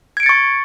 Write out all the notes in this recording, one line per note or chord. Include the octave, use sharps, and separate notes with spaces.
C#6 G#6 A6 C#7 D7